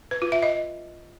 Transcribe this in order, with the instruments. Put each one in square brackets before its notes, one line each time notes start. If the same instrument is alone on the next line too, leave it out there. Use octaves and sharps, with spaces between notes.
[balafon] B4
F4
E5
D#5